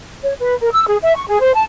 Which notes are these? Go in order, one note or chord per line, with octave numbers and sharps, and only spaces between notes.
C#5
B4
A#4
E6
G#4
E5
C#6
G#4
C5
A5